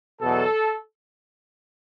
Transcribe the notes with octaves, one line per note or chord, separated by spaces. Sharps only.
E2 B2 F#3 A4